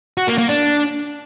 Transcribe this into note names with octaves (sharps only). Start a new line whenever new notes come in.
F#4
A#3
A#3
D4